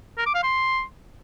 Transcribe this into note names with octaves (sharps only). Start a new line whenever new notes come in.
A#4
D6
F5
C6